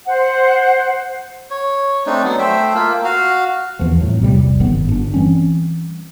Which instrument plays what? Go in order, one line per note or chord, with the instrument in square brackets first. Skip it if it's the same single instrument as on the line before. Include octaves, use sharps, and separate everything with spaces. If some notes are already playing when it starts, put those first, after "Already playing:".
[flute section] C5 F#5
[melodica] C#5
A3 C4 D4 D#4
F#3 B3
A3 C5 E5 G5
A#3 F4
F#4 F5
[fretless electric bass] E2 E3 F3
F2 A2 F#3
A#1 E2 C3 G3
F#1 G#2 D#3 B3
G1 D4
E3 G3 C4 C#4